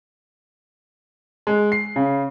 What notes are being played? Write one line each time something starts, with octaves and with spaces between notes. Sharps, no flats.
G#3
C7
C#3